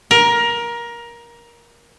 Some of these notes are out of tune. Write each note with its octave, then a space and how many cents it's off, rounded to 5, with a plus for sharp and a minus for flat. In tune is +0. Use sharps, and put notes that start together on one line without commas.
A#4 +20